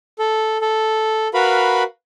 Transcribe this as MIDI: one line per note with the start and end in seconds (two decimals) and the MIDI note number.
0.19 0.57 69
0.62 1.28 69
1.34 1.83 66
1.34 1.83 70
1.34 1.83 71
1.34 1.83 77
1.34 1.83 83